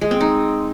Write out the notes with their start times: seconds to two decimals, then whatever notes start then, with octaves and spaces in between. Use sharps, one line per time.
0.01 G#3
0.11 C4
0.21 D#4